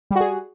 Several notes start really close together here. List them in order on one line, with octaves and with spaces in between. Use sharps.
G3 F#4 G#4